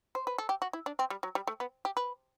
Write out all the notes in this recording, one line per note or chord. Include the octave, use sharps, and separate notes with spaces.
C5
B4
A4
G4
F#4
E4
D4
C4
G3
F#3
G3
A3
B3
G4
B4